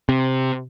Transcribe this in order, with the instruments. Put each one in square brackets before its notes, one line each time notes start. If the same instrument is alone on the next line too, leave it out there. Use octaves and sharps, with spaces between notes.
[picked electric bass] C3